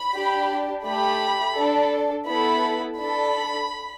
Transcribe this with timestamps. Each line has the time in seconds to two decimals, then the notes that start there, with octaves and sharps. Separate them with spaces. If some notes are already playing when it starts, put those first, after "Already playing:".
Already playing: B5
0.13 D4 G4
0.85 A3 G4 B5
1.56 D4 A4
2.27 B3 E4 A4 B5
2.98 D4 A4 B5